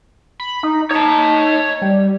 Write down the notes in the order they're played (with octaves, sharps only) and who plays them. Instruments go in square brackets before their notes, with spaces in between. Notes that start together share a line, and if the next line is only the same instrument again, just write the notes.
[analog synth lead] B5
D#4
[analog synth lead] D#4 [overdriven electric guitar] C#5 A5
[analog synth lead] G3